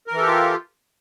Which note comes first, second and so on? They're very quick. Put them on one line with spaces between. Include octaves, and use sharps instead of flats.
A#4 E3 A4 G4 F4